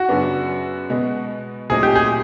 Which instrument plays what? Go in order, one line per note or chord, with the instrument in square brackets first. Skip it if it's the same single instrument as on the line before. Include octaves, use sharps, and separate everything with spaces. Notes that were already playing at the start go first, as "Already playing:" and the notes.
Already playing: [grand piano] F#4
[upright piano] F#2 C#3 F#3 B3 D4
B2 G#3 B3
[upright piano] A#2 F#3 A3 C4 D#4 [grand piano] G#4
[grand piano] G4
G#4